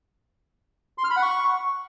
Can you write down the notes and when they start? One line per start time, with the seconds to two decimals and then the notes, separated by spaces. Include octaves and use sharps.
0.98 C6
1.04 F6
1.10 B5
1.16 F#5
1.23 C#6